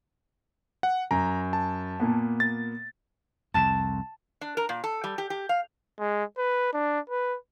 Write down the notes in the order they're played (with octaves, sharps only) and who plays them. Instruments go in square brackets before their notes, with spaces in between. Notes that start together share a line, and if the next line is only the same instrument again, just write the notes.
[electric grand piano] F#5
[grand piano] F#2 [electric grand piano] A#5
[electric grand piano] A5
[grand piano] A#2 A#3 B3
[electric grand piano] A6
[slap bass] C2 F2 [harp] A5 E7
[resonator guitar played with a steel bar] D4
A#4
A#2
A4
G3
G4
G4
F5
[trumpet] G#3
B4
D4
B4